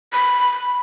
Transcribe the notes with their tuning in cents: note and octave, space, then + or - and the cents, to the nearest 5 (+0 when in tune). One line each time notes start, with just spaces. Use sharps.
B5 +0